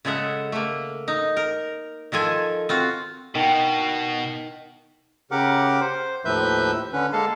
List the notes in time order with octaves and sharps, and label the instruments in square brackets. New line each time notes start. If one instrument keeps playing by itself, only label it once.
[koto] C#3 G#3 A4 E5 F#5
A3 A#3
D#4
A#4
D#3 F3 A4 G#5
C4 F4 F#4
[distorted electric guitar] B2 [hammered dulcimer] D#3
[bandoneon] C#3 G4 A#4 F#5 D6
C5
D#2 A2 F3 B4 E5 G6
D3 C#4 B4
G#3 A#3 A4 F5 A5